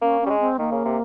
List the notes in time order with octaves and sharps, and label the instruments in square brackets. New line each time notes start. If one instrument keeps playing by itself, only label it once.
[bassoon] A#3 [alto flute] C#4
[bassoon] G3 [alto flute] C#4
[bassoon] G#3
[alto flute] C4
[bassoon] D#3 [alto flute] A#3
[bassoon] C#3
C3